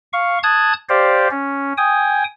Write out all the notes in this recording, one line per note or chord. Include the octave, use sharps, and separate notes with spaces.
F5 C#6
A5 D#6 F#6 G#6
G4 C5 D5 F5
C#4
G5 G#5 D#6